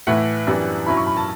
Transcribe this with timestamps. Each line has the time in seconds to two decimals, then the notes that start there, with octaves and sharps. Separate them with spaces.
0.07 A2 E3 A3 E4 F#5
0.47 F#2 E3 G3 B3 D4
0.87 G2 F#3 C#4 E4 B5
0.97 C#6
1.07 B5
1.17 A5